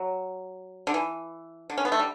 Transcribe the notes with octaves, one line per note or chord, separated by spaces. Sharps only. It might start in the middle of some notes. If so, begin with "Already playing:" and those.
Already playing: F#3
D3
E3
D3
C#4
B3
A3
G3